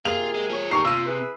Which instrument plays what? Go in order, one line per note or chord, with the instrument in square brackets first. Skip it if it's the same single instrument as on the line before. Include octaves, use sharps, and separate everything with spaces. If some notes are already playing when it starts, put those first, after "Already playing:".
[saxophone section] C3 A#3 G#4 [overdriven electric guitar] F4 [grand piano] F7
[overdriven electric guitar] G#3
F3 C#5
[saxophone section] D#3 G4 [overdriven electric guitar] G#4 A#4 [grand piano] C#6 C7
[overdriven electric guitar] C3 [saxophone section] F4 [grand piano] E6 D#7
[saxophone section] E4 G#4 B4